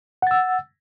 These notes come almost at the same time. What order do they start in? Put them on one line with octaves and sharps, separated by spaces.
F#5 A6 E6